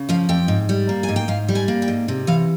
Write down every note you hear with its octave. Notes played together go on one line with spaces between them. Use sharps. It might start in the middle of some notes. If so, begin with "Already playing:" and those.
Already playing: C#3
F3 F5
F2 G5
G#2
G3
A#3
G#5
G#2
G5
G#2 F5
G3
G#5
A#3
G5
G#2
C3
E3 F5